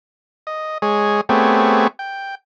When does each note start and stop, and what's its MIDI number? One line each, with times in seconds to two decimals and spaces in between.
0.47 0.78 75
0.82 1.21 56
0.82 1.21 68
0.82 1.21 73
1.29 1.87 57
1.29 1.87 59
1.29 1.87 60
1.29 1.87 67
1.29 1.87 68
1.29 1.87 73
1.99 2.35 79